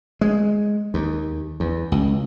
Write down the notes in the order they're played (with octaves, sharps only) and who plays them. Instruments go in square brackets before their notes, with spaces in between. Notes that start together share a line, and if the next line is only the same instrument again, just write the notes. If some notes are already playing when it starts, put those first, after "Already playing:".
[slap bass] G#3
D#2
E2
C#2